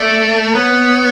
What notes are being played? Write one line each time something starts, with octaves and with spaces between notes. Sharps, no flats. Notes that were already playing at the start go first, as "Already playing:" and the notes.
Already playing: A3 D5
B3 C#5